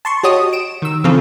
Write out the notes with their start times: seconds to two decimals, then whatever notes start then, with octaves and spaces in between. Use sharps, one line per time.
0.05 A5 C6 C#6
0.23 F#4 G4 C#5 D#5 D#6
0.53 D7 E7
0.82 D#3 E6
1.04 C#3 E3 F3 C4 F4 A4